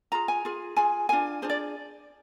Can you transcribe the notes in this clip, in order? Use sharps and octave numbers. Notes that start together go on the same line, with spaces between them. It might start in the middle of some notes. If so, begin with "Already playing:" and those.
F4 G#4 A#5
G#5
F4 G#4
F4 G#4 G#5
D4 F4 G#4 G#5
D4 F4 G#4 C5
D5